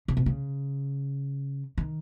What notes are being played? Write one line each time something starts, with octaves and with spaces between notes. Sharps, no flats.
C#3
B2
C#3
D#3